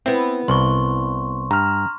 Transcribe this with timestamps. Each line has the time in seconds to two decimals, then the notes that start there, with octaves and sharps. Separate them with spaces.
0.06 B3 C4 E4
0.48 C2 C6 C#6
1.51 G2 A#5 F6